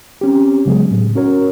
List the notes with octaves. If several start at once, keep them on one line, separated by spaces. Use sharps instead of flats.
C4 C#4 G4
C#3 F#3 G#3 B3 G#4
A2
C#4 F#4 A#4 C#5